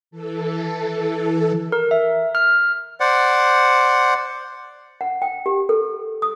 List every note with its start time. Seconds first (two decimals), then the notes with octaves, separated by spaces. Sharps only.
0.11 E3 A4
1.72 A#4
1.91 E5
2.35 F6
3.00 C5 D5 F#5
5.01 F#5
5.22 G5
5.46 G4
5.69 A4
6.22 D#6